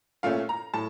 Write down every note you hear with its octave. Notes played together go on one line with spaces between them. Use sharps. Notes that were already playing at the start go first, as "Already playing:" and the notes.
A#2 A3 C#4 F5
A#5
A2 A5